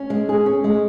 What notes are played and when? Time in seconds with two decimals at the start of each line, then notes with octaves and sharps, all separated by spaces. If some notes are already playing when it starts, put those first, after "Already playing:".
Already playing: C#4
0.10 G#3
0.29 G#4
0.46 C#4
0.64 G#3